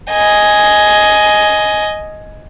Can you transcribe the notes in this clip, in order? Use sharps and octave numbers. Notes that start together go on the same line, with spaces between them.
D#5 G#5